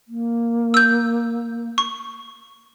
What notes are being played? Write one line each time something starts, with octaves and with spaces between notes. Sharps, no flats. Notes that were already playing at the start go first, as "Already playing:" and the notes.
A#3
E6 G6
C#6